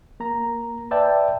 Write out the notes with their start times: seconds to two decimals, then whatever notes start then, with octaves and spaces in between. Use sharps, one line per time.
0.20 A#3 A#5
0.91 B4 D5 E5 G5 A5